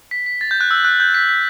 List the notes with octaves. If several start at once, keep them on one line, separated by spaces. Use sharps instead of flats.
B6
B6
A6
G6
F#6
E6
F#6
G6
B6
B6